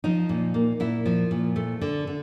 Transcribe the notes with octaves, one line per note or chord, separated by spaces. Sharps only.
F3 D#4
A#2
A#3
A#2 E4
F3
A#2
A3
D3
D3